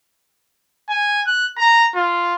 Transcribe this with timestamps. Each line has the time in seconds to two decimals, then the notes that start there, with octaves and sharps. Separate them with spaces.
0.90 G#5
1.27 F#6
1.59 A#5
1.96 F4